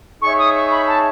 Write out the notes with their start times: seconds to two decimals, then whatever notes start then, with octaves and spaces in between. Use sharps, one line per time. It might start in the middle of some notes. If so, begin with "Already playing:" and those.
0.22 D#4 G#4 C#5 E5 C#6
0.39 D#6
0.55 C#6
0.71 B5
0.87 A5